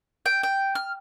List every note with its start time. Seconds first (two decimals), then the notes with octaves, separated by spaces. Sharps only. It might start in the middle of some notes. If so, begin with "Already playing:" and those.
0.26 G5
0.43 G5
0.75 F6